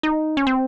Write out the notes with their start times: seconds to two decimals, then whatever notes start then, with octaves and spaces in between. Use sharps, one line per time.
0.03 D#4
0.37 C#4
0.47 C4